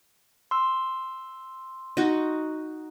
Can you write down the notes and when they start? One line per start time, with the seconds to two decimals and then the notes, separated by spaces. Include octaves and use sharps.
0.51 C6 E6
1.97 D#4 F#4